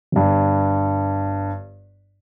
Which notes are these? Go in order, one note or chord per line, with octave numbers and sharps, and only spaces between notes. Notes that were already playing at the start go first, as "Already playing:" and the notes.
G1 G2